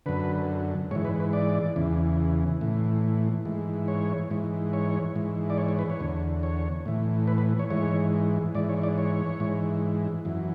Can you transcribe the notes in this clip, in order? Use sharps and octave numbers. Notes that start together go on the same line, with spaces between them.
F#2 D3 B4
G#2 E3 C#5
B4
B4
D5
E2 C#3 E3
A2 E3
G#2 E3
C#5
G#2 E3
C#5
G#2 E3
D5
C#5
C#5
B4
C#5
E2 D3
C#5
A2 E3
B4
B4
C#5
G#2 E3 C#5
G#2 E3 D5
C#5
D5
C#5
G#2 E3
F#2 E3